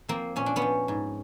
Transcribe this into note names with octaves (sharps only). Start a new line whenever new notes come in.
F3 A#3 C4
A#2 C#4
D4
B3 C#4
F3
G#2